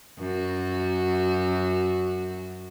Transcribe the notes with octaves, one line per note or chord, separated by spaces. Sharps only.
F#2 F#4